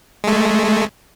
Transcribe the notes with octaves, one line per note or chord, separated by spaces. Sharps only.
G#3 A3